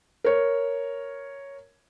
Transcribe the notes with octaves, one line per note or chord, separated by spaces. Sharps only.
A#4 C#5